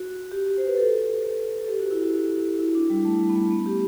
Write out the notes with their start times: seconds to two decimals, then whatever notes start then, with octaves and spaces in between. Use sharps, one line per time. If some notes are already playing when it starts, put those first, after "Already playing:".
Already playing: F#4
0.31 G4
0.57 C5
0.67 B4
0.77 A4
1.58 A4
1.68 G4
1.80 F#4
1.91 E4
2.02 F#4
2.14 F#4
2.59 E4
2.75 D4
2.90 G3
3.05 A3
3.20 G3
3.29 B3
3.36 A3
3.51 B3
3.66 G4